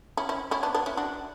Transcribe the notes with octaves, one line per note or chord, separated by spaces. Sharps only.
C#4 E4
C#4 E4
C#4 E4
B3 D4
B3 D4
C#4 E4
D4 F#4